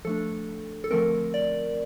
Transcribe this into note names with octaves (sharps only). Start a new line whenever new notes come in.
F3 A3 D4 A4
A4
D3 F3 A3 C4 A#4
D5